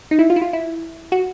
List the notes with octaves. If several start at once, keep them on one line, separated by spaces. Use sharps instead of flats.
D#4
E4
F4
E4
F4
E4
F#4